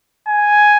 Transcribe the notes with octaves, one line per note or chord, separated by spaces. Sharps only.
G#5